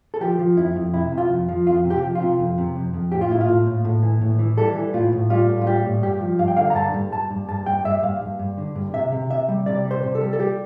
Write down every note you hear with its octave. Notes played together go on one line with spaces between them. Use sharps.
A4
F3 G4
F3
F2 E4
F2
C3 E4
C3
F4
F2
F3
F2 F4
C3
G4
F3
F4
C3
F2
C3
F2
F2
A2 G4
F4
A2 E4
F4
A2
A2
A2
E3
A2
E3
G3 A4
E3
A2 F4
A2
G3 F4
A2
F4
G3 G4
A2
G2 G4
F3
G2 F5
G5
D3 F5
A#5
G2 A5
G2
G2 A5
G2
G2 A5
G2 G5
G2 E5
G2 F5
G2
G2
D3
G2
C3 E5
C3
C3 E5
G3
C3 D5
G3
C5
C3
A4
G3
A4
G3 G4